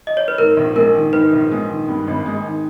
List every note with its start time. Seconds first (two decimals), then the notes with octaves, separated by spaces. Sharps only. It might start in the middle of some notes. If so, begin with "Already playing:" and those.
0.07 D#5
0.17 C#5
0.28 B4
0.38 G#2 A#4
0.57 A#1
0.75 G#3 A#4
0.95 D#3
1.13 G#2 B4
1.33 A#1
1.51 G#3
1.69 D#3
1.88 G2
2.07 G#1
2.26 G#3
2.45 D#3